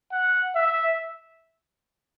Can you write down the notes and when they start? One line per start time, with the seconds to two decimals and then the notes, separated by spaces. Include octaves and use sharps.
0.12 F#5
0.55 E5